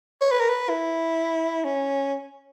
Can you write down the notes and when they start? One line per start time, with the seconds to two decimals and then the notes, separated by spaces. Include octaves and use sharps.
0.21 C#5
0.31 B4
0.41 A#4
0.49 B4
0.69 E4
1.65 C#4